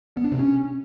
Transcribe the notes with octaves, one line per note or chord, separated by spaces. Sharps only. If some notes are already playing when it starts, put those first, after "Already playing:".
B3
D4
C3
C#4